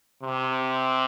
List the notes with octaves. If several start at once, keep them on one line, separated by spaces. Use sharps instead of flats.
C3